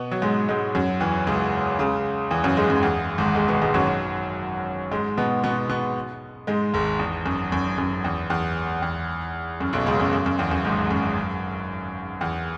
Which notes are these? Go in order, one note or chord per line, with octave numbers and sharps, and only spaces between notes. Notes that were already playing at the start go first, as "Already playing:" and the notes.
Already playing: B2 B3
F#3
G#2 G#3
G#2 G#3
F#2 F#3
E2 E3
C#2 C#3
C#2 C#3
E2 E3
F#2 F#3
G#2 G#3
F#2
E2
G#1 G#2
G#2 G#3
B2 B3
G#2 G#3
F#2 F#3
G#2 G#3
B2 B3
B2 B3
B2 B3
G#2 G#3
G#1 G#2
E2
F#2
F#2
F#2
E2
E2
E2
F#2
B1 B2
C#2 C#3
F#2
F#2
F#2
E2
F#2
G#1 G#2
F#2
E2